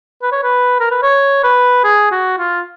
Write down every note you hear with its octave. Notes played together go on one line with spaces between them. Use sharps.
B4
C#5
B4
A#4
B4
C#5
B4
G#4
F#4
F4